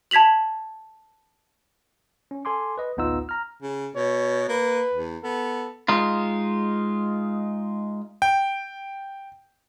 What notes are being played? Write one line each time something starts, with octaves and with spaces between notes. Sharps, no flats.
A5 G#6 B6 F7 F#7
C#4
A4 G#5 C6 D6
B4 D#5
A1 D2 B3 D#4 F4 E6
A#5 F6
C#3
B2 C#5
A#3 B4
E2
B3 A4
G#3 D#4 F4
G5